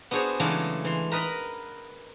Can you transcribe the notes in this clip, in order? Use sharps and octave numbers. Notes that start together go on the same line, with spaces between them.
B3 D4 F#4 G#4 C5 C#5
C#3 E3 F#3 G#3 A3 D4
E3 C6
A#4 B4 D#5 A#5 B5